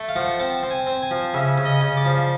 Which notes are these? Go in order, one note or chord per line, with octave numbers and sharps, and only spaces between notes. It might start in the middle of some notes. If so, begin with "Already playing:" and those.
Already playing: A3
F5
F3 F#5
C4 A5
C4
G#5
C4
G#5
F3
C#3 E5
C#3
D#5
C#3
D5
F3